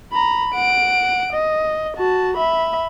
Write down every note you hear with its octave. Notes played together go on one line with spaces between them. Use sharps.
A#5 B5
F#5 D7
D#5
F#4 A5
E5 B5